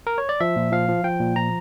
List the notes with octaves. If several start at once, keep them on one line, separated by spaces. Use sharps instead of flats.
A#4
C#5
D5
F3 E5
A#2
F3 F5
F3
F3 G5
A#2
F3 A#5